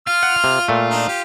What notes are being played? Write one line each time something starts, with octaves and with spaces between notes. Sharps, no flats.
F4 F6
F#5
C3
A#2 A3
D4 D#4
G4